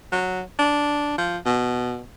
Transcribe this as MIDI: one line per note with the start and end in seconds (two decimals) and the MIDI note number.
0.12 0.42 54
0.59 1.17 62
1.18 1.38 53
1.46 2.02 47